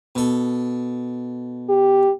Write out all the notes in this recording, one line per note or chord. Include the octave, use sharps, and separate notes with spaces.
B2 A4
G4